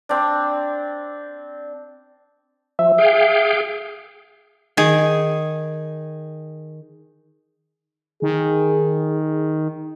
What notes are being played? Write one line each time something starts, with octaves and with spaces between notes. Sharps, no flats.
C4 D4
F3 E5
G#4 F5 G5
D#3 G#4
D#3 G#4